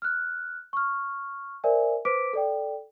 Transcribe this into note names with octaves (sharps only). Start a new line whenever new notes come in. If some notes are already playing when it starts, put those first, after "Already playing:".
F6 F#6
C#6 F6
A#4 C5 D5 E5 G#5
B4 C5 D6 B6 D7
A4 D5 G5